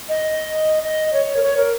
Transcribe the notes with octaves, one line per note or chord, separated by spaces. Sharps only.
D#5
D#5
C#5
A#4
C#5
A#4